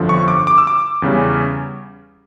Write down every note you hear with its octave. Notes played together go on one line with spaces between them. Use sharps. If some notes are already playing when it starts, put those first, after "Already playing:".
Already playing: G1 F2 D3 F3
C#6
D6
D6
E6
D6
E2 C#3 G3 C#4